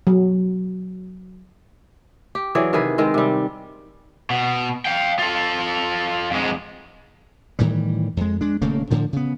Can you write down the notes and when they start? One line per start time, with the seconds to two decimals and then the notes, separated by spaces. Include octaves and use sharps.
0.07 F#3
2.35 G4
2.55 E3 F#3 G#4 D5
2.73 C3 D#3 G#4 B4
2.98 D#3 G#3 C4
3.14 C3 G3
4.30 B2
4.85 F5 G5
5.19 F4 A4
6.31 F2 G#3
7.59 A2 D#3 E3 G3
8.17 F2 G#3
8.41 G#3 D4
8.62 D#1 C#3 A3 A#3
8.90 A2 D3 F3
9.13 C#3 B3